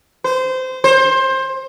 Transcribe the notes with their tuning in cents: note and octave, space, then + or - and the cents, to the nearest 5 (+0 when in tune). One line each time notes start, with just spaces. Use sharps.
C5 -20
C5 +20